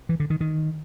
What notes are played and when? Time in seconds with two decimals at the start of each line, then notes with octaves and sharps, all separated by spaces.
0.09 E3
0.20 D3
0.30 D#3
0.41 D#3